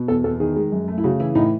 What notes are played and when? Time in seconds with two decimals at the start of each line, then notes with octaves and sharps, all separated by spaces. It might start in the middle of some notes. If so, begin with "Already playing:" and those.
Already playing: B2
0.08 E2 A4
0.24 E2 A4
0.40 D#3 G#4
0.56 G#3
0.72 F#2
0.88 A3
0.98 E4
1.04 C#3 F#4
1.20 E3 E4
1.35 A2 D#4